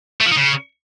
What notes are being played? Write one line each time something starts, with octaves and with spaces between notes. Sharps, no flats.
A3
F3
D#4
C#3